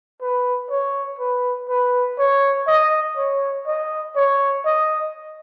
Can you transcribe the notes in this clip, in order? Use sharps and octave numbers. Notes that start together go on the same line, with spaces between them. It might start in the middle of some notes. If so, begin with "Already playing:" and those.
B4
C#5
B4
B4
C#5
D#5
C#5
D#5
C#5
D#5